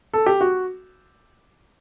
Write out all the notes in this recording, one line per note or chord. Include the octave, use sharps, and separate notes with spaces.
A4
G4
F#4